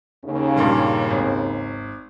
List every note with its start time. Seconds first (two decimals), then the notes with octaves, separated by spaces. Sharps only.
0.24 D#2 C#3
0.56 G2 A#2 G3
1.10 G#1